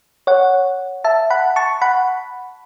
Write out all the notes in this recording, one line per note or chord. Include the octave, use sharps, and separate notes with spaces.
C#5 F#5
E5 A5
F#5 B5
A5 C#6
F#5 B5